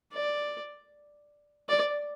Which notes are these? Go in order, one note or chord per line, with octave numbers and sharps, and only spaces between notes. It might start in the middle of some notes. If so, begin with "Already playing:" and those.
D5
D5